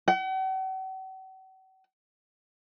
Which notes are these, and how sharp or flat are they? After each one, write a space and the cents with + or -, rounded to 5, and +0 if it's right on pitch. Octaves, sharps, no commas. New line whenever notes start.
F#5 +45